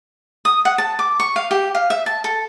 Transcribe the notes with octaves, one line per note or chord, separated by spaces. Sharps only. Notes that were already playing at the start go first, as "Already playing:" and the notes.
D#6
F#5
A5
D6
C#6
F5
G4
F5
E5
A5
A4